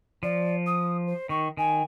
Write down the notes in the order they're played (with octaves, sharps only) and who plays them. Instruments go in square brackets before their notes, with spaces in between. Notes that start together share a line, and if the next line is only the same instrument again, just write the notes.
[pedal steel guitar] F3 [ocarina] D5
[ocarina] D#6
C5
[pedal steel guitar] D#3 [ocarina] C#6
[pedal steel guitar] D#3 [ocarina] G#5